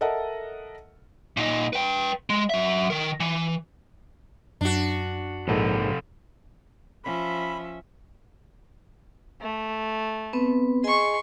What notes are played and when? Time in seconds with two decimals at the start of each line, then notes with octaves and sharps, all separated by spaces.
0.01 A4 A#4 D#5 E5 F#5 A5
1.37 A#2 D#4
1.73 B4 G5
2.30 G#3
2.50 F#3 E5
2.90 D#3 A#4
3.20 E3
4.61 F#2 D4 F#4
5.48 A#1 G#2 C3 A4 D#5
7.05 F3 C#4 E5 B5
9.41 A3
10.33 B3 C4 B4
10.84 G#4 D#5 G#5 C6 C#6